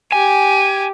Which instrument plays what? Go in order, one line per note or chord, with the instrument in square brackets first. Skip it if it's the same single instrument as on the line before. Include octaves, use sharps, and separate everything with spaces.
[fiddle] G4 [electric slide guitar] G#5